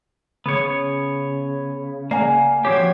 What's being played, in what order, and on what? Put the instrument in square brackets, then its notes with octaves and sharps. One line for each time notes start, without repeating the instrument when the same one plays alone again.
[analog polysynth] C#3 [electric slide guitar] B3 C#5
[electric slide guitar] A#3 [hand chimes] D5 F#5 G#5
[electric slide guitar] F3 C4 G4 [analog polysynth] F#4 G#6 [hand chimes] C#5